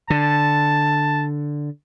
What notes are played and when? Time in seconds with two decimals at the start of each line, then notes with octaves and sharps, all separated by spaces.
0.10 D3 A5